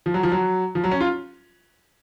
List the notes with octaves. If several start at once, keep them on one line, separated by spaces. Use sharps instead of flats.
F3
F#3
F3
F#3
F3
F#3
C#4
F4